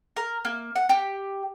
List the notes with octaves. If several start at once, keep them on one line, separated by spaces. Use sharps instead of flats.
A#4
A#3
F#5
G4